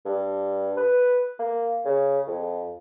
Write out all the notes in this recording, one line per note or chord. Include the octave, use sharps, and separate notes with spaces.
G2
B4
A#3
C#3
F2